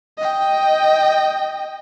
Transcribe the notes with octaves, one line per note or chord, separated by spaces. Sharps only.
D#5 G5